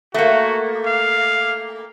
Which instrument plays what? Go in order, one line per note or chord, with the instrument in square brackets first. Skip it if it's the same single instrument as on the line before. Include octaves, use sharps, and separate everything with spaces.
[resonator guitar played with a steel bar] A3 A#3 [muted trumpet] F#4
[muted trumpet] F5